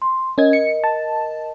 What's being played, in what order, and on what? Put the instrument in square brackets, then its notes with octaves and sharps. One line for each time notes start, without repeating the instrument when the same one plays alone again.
[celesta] C6
[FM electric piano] C#4 G#6 [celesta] A#4 D#5
[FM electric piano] C#7
A5